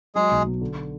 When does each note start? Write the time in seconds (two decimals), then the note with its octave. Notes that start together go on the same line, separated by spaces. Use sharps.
0.15 F#3 G#3 G#4
0.31 B1
0.46 B2
0.61 D3